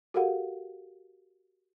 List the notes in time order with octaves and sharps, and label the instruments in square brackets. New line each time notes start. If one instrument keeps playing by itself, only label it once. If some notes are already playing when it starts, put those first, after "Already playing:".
[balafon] F#4 G4 A4 A#4 F5 F#5